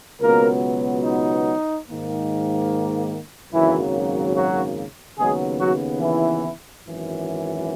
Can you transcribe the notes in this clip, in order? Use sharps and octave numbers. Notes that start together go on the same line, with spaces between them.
C#2 B2 F#3 A#3 B3 A#4
D#4
G#2 D#3 A#3
G#1 F#2 C#3 E3 F#3 A#3 E4
F#3 F#4
D#2 C#3 F#3 G#3 B3 G#4
F#3 F#4
E3 E4
G#1 F#2 E3